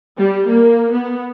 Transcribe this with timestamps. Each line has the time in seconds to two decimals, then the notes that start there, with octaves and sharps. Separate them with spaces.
0.18 G3
0.48 A#3
0.92 B3